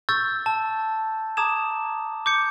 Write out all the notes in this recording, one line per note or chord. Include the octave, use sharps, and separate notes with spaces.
C#6 E6 G6 A6
A5
A5 A#5 D6 D#6 G#6 E7
D6 G6 C#7